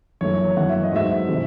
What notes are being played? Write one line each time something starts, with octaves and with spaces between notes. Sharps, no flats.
F#2 E3 A3 C#5
F#2 E3 A3 F#5
E5
D#5
G#2 F#3 A3 E5
C3 E3 A3